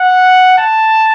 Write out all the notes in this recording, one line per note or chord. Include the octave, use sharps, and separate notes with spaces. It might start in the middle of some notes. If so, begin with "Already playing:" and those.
Already playing: F#5
A5